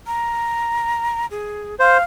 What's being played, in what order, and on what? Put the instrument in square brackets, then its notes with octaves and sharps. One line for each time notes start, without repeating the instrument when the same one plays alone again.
[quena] A#5
G#4
[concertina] C5 [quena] F5